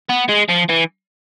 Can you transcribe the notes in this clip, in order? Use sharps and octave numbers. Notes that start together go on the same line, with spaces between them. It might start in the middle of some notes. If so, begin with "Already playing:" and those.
B3
G#3
F3
E3